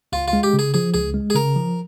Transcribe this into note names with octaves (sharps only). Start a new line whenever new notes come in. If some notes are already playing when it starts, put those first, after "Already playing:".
C#2 F4
F4
G#3
G4
C#3
G#4
F3 G#4
C#2 G#4
G#3
G#4
C#3 A#4
F3